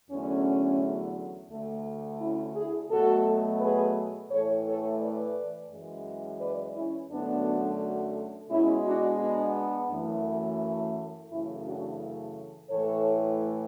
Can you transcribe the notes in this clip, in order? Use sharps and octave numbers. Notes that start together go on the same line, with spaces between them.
E2 D3 F#3 A3 C#4
D2 D3 A3
C#4 E4
E4 G#4
B2 F#3 A3 F#4 A4
G#4 B4
A2 E3 A3 A4 C#5
A4 C#5
B4 D5
F#2 E3 G#3
B4 D5
C#4 E4
F#2 D3 F#3 A3 B3 D4
B2 G#3 C#4 E4
D4 F#4
B3 D4
F#2 E3 A3
F#2 C#3 E3 A3 C#4 E4
D4 F#4
A2 E3 A3 A4 C#5